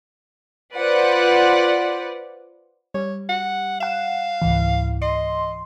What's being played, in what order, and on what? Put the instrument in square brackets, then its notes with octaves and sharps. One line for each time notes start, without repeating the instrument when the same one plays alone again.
[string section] F4 B4 C5 D5 F#5
[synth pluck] G3 [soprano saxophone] C#5
[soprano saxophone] F#5
[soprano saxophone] F5 [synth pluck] F#5 E7
[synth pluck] C#2 G#2 E3
[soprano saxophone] D#5 [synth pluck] C6